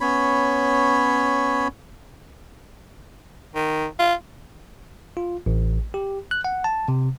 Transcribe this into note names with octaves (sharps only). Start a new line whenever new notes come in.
B3 C#4 C#5 B5
D#3
F4
F4
A1
G4
F#6
F#5
A5
C3